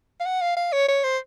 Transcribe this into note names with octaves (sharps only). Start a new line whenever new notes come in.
F5
F#5
F5
F5
C#5
C#5
C5